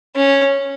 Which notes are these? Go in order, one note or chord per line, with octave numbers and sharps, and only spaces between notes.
C#4